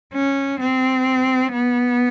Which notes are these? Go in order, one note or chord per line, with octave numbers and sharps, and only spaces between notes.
C#4
C4
B3